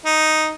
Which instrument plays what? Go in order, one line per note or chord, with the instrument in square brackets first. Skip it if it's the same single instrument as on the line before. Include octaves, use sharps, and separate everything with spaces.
[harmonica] D#4